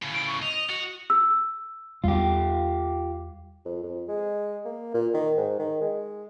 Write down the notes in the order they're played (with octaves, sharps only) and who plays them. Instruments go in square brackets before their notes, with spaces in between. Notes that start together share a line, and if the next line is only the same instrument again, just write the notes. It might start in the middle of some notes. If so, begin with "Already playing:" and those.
[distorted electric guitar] A2 C#3
[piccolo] D7
C#6
[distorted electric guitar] D#5 [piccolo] F7
[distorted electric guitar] F#4
[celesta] E6
[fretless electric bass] E2 G3 [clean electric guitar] F4 G4
[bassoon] F2
F2
G#3
A#3
A#2
D#3
G#2
D#3
G#3